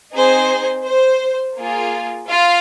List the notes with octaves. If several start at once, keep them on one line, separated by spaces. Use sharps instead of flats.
C4 D#4 G#4 C5
C5
A#3 F4 G#4
F4 F5